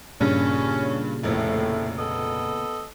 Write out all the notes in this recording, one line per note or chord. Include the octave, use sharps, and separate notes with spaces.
G2 A#2 C#3 C#4
F1 A#1 A2
B3 A4 D#5